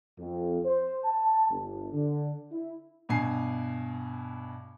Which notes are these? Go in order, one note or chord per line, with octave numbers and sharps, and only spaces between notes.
F2
C5
A5
G1
D3
E4
G2 B2 G#5 C7